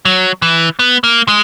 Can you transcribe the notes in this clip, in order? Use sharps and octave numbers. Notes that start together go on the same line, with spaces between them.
F#3
E3
B3
A#3
G#3